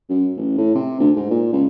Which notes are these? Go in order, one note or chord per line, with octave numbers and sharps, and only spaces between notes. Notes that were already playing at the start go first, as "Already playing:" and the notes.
F#2
A1
A2
C3
D2
G#2
A#2
C#2